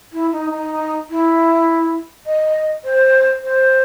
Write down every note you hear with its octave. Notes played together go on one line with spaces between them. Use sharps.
E4
D#4
D#4
E4
D#5
C5
C5